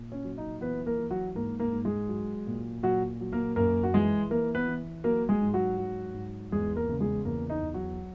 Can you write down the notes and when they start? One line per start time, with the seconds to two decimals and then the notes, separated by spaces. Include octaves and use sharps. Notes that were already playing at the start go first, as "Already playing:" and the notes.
Already playing: A#2
0.12 C#4
0.24 F#3
0.38 D#4
0.61 E3 B3 B4
0.86 A#3 A#4
0.99 E3
1.10 F#3 F#4
1.35 G#2 A#3 A#4
1.60 A#3 A#4
1.73 G#2
1.85 G#3 G#4
2.09 F#3
2.47 A#2
2.83 A#2 F#3 F#4
3.20 F#3
3.32 A#3 A#4
3.56 F#2 A#3 A#4
3.83 F#4
3.94 E3 G#3 G#4
4.30 E3 A#3 A#4
4.55 B3 B4
4.68 E3
5.04 F#3 A#3 A#4
5.29 G#3 G#4
5.42 G#2
5.54 F#3 F#4
5.78 F#3
6.14 G#2
6.52 E2 G#3 G#4
6.76 A#3 A#4
6.89 C#3
7.00 G#3 G#4
7.25 E2 A#3 A#4
7.50 D#4
7.62 E2
7.74 F#3 F#4